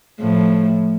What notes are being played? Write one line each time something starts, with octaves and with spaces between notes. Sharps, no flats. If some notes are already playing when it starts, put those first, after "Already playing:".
A2 F3